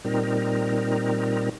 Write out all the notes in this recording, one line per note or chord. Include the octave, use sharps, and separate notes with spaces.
A#2 G3 C4 D#4 A#4